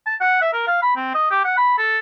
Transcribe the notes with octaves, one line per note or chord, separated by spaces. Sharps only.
A5
F#5
E5
A#4
F5
B5
C4
D#5
G4
F#5
B5
A4